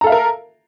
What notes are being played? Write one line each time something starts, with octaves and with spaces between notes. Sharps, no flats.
A4 A#4 E5 F5 A#5